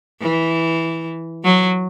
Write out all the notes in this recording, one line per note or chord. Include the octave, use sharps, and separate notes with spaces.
E3
F#3